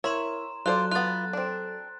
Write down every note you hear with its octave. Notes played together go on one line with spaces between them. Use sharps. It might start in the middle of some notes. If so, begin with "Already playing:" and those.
E4 A#4 C#5 E5 A#5 C6 E7
F#3 F4 A4 C5 D5 F#6
B3 F4 F#6 A6
C4 D4